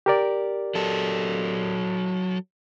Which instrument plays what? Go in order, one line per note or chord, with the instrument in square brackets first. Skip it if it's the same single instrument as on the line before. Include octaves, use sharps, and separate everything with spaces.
[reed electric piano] G4 A#4 D5
[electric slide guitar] F#3 A4